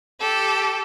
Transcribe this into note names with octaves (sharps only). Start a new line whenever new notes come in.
G4 A4